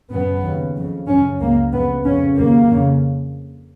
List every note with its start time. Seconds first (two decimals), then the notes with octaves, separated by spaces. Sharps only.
0.11 F#2 C#3 B3
0.43 D#2 C#3
0.76 F2 C#3
1.08 F#2 C#3 C#4
1.40 C#2 C#3 A#3
1.72 F2 C#3 B3
2.05 F2 C#3 C#4
2.37 D#2 C#3 A#3
2.69 F2 C#3